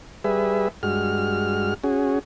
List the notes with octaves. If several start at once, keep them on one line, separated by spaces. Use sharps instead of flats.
G3 G#4 B4 E5
G2 G#3 F#4 F6
C#4 F#4 G#4